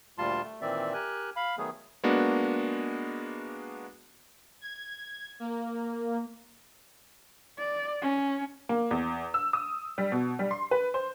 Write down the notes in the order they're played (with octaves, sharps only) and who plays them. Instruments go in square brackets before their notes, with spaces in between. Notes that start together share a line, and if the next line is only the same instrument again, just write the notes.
[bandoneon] D2 A#2 G3 F4 A5 C6
A3
A#2 D#3 E3 C4 D5 E5
G4 A#4 G#5 F#6
F5 B5
D#3 F#3 A3 B3 G#4
[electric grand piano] G#3 A#3 B3 D4 F#4
[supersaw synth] G#6
A#3
[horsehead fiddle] D5
C#4
[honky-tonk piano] A#3
E2
E6
D#6
G3
B2
G3
C6
B4
C5